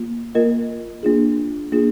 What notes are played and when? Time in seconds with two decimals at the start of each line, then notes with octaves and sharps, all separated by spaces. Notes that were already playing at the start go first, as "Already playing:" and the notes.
Already playing: A#3 F4
0.35 A#3 F4 A#4 D#5
1.03 A#3 D4 F4 G#4
1.72 A#3 D4 F4 G#4